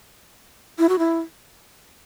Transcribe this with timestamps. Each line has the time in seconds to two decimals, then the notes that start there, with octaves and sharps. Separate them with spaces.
0.79 E4
0.89 F#4
0.99 E4